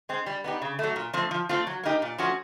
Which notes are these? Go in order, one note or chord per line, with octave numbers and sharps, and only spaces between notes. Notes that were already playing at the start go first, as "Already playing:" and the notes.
G#3 C4
G3
B3 D#4 G4
C#3
F#3 A3
A#2
F3 A3 C4
F3
A3 C4 F4
F#3
A#3 D#4 G4
A#2
F3 A3 C#4 F#4